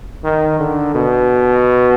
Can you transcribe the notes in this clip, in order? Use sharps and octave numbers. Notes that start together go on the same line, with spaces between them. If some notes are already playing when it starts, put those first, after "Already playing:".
D#3
D3
B2